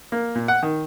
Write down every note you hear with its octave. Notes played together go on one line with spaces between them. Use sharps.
A#3
A#2
F#5
D#3